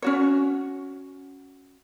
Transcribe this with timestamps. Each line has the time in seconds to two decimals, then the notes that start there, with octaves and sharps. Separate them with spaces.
0.02 C#4 F#4 C#5